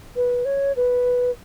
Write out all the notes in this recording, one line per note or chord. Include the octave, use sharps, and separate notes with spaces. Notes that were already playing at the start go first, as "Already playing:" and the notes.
B4
C#5
B4